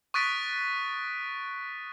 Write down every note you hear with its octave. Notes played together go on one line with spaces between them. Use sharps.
C#6 D#6 F#6 A6 B6 D7